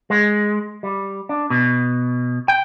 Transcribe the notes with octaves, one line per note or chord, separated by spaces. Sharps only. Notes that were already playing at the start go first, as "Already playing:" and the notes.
G#3
G3
D4
B2
G5